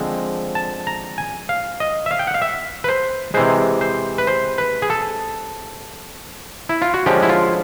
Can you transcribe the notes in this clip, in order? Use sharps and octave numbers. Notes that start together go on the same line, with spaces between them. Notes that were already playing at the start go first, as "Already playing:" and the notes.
Already playing: D3 F3 G#3 C4
A5
A#5
G#5
F5
D#5
E5
F5
G5
F#5
F5
E5
B4
C5
C3 E3 G#3 C5
C5
B4
C5
B4
G#4
A4
E4
F4
F#4
D3 F3 G#3 C#4 G4
E4
F4